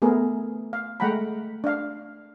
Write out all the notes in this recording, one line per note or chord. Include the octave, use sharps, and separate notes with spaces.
A3 B3 G#4 A#4
F5
G#3 A3 F#5 G5 A#5 B5
D4 F5